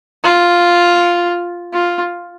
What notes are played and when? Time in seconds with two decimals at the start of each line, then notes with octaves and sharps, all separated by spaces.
0.24 F4
1.73 F4